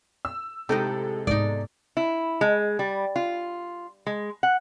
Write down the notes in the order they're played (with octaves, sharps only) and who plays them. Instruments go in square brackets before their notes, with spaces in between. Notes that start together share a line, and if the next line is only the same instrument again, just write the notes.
[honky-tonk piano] E6
[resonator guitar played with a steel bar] A2 D#4 G4 [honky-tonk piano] C3 G#3 A4
[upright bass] G#2 B3 [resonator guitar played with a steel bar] D#4 D5
[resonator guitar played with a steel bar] E4
G#3
G3
F4
G#3
F#5